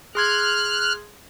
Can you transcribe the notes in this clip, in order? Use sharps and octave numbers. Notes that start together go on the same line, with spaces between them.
G#4 C6 F6 F#6 G#6